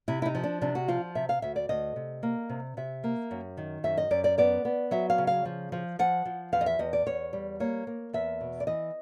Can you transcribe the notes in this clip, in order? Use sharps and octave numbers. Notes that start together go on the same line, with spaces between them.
C3 E4
E4
D#4
F3
D4
C3 D4
F#4
F3 F4
C3 E5
F5
D2 E5
D5
D2 D#5
C3
A#3
C3
C3 E5
A#3
F#2
D#3
F#2 E5
D#5
F#2 D5
D5
B3 D5
B3
F#3 E5
F5
C#3
F5
F3
F3
F3 F#5
F3
E2 F5
D#5
E5
E2 D#5
D5
E2 C#5
G3
A#3 C#5
A#3
E2 E5
B2
D5
E3 D#5